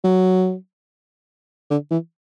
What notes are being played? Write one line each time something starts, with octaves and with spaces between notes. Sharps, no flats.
F#3
D3
E3